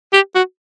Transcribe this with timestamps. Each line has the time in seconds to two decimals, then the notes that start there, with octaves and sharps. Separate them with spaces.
0.13 G4
0.35 F#4